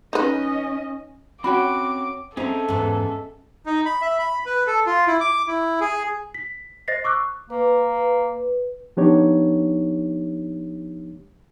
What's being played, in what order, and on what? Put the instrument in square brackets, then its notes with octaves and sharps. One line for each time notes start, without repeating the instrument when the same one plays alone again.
[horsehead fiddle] C#4 D#5 [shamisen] D#4 B4
[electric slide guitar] C4 G5 [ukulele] C#4 F#4 B5 [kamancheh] D6
[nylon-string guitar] C4 [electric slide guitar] C#4 D#5 E5 [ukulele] G#4 A#5 [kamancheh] A4
[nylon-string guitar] E2 G#2
[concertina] D#4
B5
E5
B5
B4
A4
F4
E4
D6
E4
G#4
[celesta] B6
C5 D#5 A6 A#6 C7
C#6 D6 E6 F#6
[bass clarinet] A#3 [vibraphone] B4
[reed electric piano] F3 B3 D4 D#4 G4 C#5